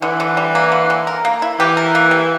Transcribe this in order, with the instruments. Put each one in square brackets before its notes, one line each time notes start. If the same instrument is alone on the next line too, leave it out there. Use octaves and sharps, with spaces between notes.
[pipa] D3 [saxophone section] E3
[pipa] D3
G3
A#3
D3
D3
A#4
A#3
E4
[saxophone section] E3 [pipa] G4
[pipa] A#4
A#3
G3